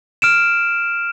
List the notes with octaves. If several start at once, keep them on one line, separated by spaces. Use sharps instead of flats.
F6 D7 E7